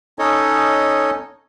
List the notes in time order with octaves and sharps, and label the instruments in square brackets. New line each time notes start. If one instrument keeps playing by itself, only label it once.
[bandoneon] C#4 D#4 A4 C#5 D#5